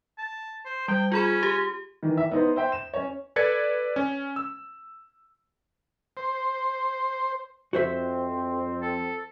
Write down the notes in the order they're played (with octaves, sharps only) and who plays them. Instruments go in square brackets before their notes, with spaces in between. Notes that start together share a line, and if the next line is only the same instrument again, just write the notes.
[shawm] A5
C5
[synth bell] G3 [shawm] G5
[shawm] C#4 [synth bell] F4 G#4 B5
[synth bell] G4
[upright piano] D#3 E3
E5
B3 D#4 C5
C5 E5 G5
E7
C#4 C#5
[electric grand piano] A4 B4 D5 G#6 A6 C#7
C#4
E6
[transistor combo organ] C5
[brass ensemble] F2 C4 [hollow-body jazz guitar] F#4 C5 E5
[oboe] A4